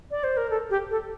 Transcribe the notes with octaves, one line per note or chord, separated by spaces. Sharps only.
D5
C5
A#4
A4
G4
A4